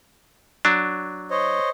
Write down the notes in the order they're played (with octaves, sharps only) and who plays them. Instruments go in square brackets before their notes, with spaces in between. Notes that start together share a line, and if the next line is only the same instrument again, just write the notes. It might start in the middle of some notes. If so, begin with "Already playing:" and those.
[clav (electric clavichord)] F#3 D4
[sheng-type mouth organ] C5 C#5 D#5